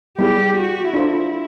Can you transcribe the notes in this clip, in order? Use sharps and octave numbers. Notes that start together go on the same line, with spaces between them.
G3 B3 E4 G4 G#4
F#4
D4 E4 F4 A4 C5